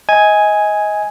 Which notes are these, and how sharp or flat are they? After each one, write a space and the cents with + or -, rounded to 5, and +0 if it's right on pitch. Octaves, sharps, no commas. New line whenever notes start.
D#5 +25 G#5 +0